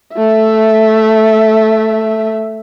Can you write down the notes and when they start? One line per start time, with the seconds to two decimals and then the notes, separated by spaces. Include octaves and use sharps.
0.15 A3 E5